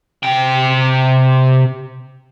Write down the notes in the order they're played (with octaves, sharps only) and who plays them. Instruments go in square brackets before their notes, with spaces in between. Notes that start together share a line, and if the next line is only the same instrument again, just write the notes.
[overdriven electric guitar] C3 G5